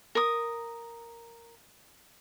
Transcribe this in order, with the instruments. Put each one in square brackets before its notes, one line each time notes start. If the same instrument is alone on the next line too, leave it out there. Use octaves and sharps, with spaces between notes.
[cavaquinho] A#4 D#6